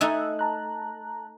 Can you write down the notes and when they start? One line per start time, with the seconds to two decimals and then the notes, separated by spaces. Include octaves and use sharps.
0.01 A3 D#4 G#5 E6 F#6
0.39 A5 A#5 F#6